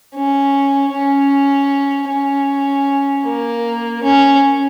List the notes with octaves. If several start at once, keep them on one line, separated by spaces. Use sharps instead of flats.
C#4
C#4
C#4
A#3
C#4